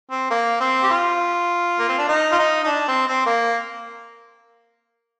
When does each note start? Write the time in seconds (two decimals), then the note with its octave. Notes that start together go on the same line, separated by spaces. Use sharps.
0.11 C4
0.30 A#3
0.60 C4
0.83 G4
0.90 F4
1.79 A#3
1.89 C4
1.98 D4
2.09 D#4
2.32 F4
2.38 D#4
2.63 D#4
2.67 D4
2.88 C4
3.07 C4
3.26 A#3